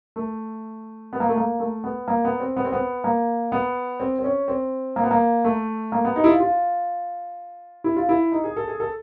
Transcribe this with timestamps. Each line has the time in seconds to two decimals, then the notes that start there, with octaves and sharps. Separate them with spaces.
0.16 A3
1.13 B3
1.20 A#3
1.28 A3
1.37 A#3
1.60 A3
1.84 B3
2.08 A#3
2.25 B3
2.40 C4
2.56 B3
2.65 C4
2.72 B3
3.04 A#3
3.52 B3
4.00 C4
4.19 C4
4.24 C#4
4.48 C4
4.96 A#3
5.03 B3
5.11 A#3
5.45 A3
5.92 A#3
6.05 B3
6.16 D#4
6.24 E4
6.29 F4
6.40 F4
7.84 E4
7.96 F4
8.09 E4
8.32 D#4
8.44 G#4
8.56 A4
8.68 G#4
8.80 A4